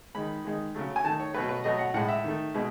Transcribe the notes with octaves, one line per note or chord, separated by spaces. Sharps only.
D#3 G#3 B5
D#3 G#3
C#3 F#3 A3
G#5
D#3 A3 A5
C#5
B2 F#3 A3 B4
B4
B2 F#3 A3 D#5
F#5
A2 G#3 F#5
E5
D#3 A3
B2 G#3